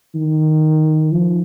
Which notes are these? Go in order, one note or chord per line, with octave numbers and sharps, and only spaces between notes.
D#3
F3